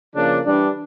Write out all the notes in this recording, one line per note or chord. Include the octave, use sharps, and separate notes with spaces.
C#3 F3 A#3 D4
E3 G3 D4